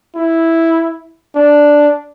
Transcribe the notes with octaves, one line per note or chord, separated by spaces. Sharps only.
E4
D4